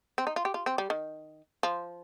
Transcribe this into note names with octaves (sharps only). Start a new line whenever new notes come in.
C4
D#4
F4
G4
F4
C4
G3
D#3
F3